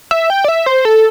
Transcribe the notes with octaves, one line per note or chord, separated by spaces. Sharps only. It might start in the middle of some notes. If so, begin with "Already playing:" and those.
E5
G5
D5
E5
C5
A4